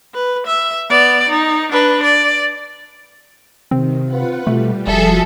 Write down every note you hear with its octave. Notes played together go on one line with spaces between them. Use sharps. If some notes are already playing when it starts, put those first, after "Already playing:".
B4
E5
B3 D5
D#4
D4 B4
D5
C3 D#3 C4
F4 B4 F#5
B2 G3 A3
F1 F3 G3 F#4 G#4 A4 E5